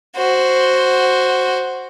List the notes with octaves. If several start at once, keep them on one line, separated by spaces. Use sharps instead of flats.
F#4 C5